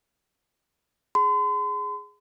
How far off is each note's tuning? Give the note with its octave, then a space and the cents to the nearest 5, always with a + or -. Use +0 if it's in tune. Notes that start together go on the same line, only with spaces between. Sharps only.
G#4 +0 C6 -45